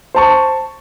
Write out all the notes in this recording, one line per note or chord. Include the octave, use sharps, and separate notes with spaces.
C5 A5 C#6